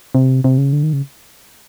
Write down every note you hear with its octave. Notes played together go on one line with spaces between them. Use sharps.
C3
C3
C#3
D3
D#3
C#3